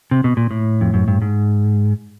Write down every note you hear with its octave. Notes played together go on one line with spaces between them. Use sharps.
C3
B2
A#2
A2
F2
F#2
G2
G#2